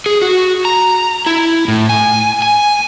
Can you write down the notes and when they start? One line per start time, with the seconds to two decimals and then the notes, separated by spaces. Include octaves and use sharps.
0.06 G#4
0.22 F#4
0.65 A#5
1.26 E4
1.68 A2
1.89 G#5
2.42 G#5